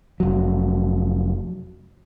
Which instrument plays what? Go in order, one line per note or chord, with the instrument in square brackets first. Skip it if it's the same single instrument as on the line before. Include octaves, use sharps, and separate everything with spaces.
[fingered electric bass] F1 F#3